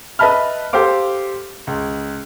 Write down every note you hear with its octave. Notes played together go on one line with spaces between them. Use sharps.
B4 D#5 E5 A5 B5 F6
G4 A4 C5 F5 D6
C#2